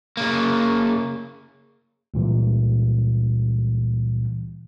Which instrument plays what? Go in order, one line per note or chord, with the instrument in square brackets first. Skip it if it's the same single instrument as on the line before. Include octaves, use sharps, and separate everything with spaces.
[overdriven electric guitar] C#3 A#3
[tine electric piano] C#2 A#2 E3 G3